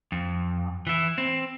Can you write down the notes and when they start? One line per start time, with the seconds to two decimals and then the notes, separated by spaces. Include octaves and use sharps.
0.12 F2
0.87 E3 E4
1.18 C4